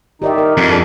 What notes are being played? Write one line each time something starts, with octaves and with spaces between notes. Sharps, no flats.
D#3 D#4 G4 D5 E5
A#4
F2
D4 G#4 A4 D5